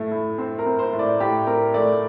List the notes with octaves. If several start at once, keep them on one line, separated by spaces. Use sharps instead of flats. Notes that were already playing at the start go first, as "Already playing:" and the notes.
Already playing: A2 A3
A2
C4
A#4
C4
C5
A2
D5
A2 G4
C4 A#4
A3 D5